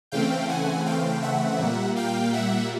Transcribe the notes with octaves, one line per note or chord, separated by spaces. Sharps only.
C#3 E3 A3 C4 F5 G5
F#5 G#5
F5 G5
E5 F#5
A#2 G3 A#3
F5 G5
E5 F#5